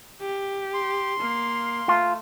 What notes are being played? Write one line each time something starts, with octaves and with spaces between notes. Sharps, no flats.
G4
C6
A#3 F5
A3 F4